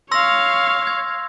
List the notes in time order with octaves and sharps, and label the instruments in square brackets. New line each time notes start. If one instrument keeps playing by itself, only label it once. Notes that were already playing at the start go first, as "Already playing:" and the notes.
[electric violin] C#5 F5 [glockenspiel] C6 E6 A#6
[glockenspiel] G#6